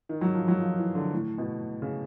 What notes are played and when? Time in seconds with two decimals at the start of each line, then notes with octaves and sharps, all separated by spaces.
0.09 D#3
0.21 F#3
0.35 F3
0.48 F#3
0.61 F3
0.78 E3
0.95 D3
1.13 A2
1.38 B2
1.82 C#3